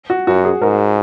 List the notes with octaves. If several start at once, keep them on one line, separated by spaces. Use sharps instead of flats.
F#4
F#2 F#4
G#4
G#2 A#4